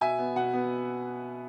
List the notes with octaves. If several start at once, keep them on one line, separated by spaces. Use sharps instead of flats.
B2 E5 G#5
B3
B2 F#5
B3